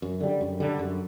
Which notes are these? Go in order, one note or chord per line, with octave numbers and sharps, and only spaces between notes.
F#2
D3 G3
F#2
D3 G3
F#2